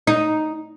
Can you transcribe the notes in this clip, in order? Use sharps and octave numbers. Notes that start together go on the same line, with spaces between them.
D#4